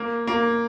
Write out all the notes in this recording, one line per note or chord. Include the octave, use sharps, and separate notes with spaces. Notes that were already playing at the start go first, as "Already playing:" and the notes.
Already playing: A#3
A#3